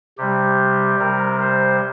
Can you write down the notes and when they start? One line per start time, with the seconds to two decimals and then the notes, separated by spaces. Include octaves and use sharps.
0.18 C3 G3 G4
0.99 C3 G3 A#4
1.40 C5